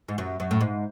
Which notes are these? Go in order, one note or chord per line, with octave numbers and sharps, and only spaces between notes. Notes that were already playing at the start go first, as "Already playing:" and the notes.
G#2
F#2
F#2
A2
G#2